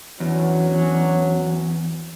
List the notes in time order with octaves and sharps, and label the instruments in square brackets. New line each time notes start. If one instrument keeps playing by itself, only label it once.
[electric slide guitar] E2 [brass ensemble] F#3 C#4 D4